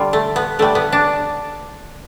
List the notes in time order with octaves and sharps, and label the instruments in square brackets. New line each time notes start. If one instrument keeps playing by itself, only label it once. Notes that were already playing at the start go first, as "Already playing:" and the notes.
Already playing: [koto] D3 G3 F4
A3
B3
D3 G3 A3
B3
D4